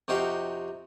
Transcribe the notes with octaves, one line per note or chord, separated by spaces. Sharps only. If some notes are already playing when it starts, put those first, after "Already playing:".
F2 C3 D#4 F#4 G4 F5